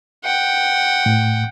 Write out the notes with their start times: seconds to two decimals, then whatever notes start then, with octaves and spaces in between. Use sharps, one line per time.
0.24 F#5 G5
1.06 A2